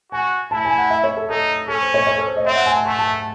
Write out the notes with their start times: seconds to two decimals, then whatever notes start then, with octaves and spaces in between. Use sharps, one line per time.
0.12 F#4 G#5
0.51 E4 A5
0.65 G#5
0.78 F#5
0.90 E5
1.04 C#5
1.17 A4
1.30 D#4 A4
1.68 C#4 A4
1.82 C5
1.94 C#5
2.07 C#5
2.18 A4
2.27 C5
2.37 D#5
2.46 C4 E5
2.56 F#5
2.66 G#5
2.76 A5
2.85 A3 C6
2.99 A5